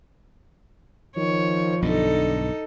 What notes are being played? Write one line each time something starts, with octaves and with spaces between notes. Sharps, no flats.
D#3 F3 C#5
B1 G2 D3 D#4 A4